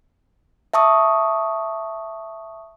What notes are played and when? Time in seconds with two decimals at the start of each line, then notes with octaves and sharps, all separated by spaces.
0.74 E5 A5 C#6 D#6